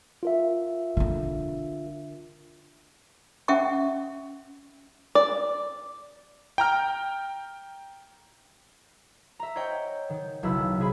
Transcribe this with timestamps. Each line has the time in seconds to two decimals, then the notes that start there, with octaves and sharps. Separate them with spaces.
0.23 F4 A#4 E5
0.97 D3 D4
3.48 C#4 E5 F#5 G5 C#6
5.15 D5
6.58 G5 A#5 F6
9.40 E5 A#5
9.55 C5 C#5 D#5 F#5 G5
10.10 D#3
10.43 F#1 B1 E4 B4 E6 F6
10.79 C3 G#4 B5